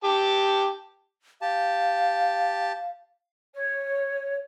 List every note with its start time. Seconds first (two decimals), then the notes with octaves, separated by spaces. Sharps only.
0.04 G4 A5
1.42 G4 F5 A5
3.54 C#5